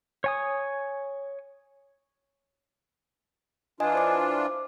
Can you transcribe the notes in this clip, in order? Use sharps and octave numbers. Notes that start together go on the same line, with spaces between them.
C#5 G#5 D#6
E3 D4 F4 D#5 G#5
C5 D6